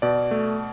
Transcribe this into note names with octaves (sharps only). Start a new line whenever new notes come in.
B2 D5
A3